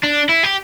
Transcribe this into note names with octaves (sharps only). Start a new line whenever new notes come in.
D4
E4
G4